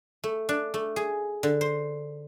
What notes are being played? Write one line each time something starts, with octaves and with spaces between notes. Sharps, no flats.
A3
D4
A3
G#4
D3
C5